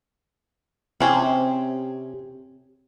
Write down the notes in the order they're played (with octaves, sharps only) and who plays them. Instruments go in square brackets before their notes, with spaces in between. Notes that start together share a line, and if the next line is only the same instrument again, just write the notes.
[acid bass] C3 [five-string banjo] C4 C#4 G#4